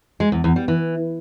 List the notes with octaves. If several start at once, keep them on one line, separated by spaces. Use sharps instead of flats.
G#3
E2
E2
G3
E3